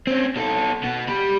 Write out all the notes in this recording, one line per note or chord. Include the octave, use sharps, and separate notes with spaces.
C4 C#4
B2 A4
B2 B3
G4 B5